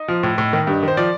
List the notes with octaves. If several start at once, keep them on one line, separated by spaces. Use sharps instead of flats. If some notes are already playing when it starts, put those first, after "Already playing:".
Already playing: D#4
F3
A2
A2
D#3
G2
D#3 C5
F3 D5